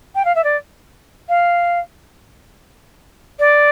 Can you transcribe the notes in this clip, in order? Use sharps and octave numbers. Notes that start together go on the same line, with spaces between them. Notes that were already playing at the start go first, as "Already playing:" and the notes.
G5
F5
E5
D5
F5
D5